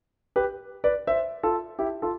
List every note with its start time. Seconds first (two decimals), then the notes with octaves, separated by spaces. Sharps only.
0.36 G4 B4
0.84 B4 D5
1.07 C5 E5
1.43 F4 A4
1.79 E4 G4
2.02 F4 A4